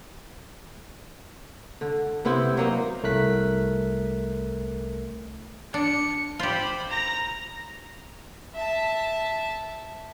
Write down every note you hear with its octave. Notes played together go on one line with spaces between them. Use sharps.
D3
C3 B3 C4 E4
F#3 A#3 D#4
C2 A3 A#4 F#6 B6
D4 C#7
F4 G4 C5 B5
A#5 A#6
E5 A5